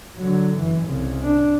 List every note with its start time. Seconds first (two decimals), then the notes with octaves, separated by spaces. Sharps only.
0.17 D3 F#3
0.57 F#1 E3
0.87 C2 C#3
1.23 D4